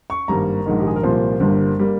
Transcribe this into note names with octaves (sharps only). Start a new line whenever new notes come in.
C#6
G#1 G2 G3 A#3 A#5
A#1 G#2 D#3
G4
G#4
A#4
C2 A#2 F3 A#3 C5
G1 G2 G3 A#3
G3 A#3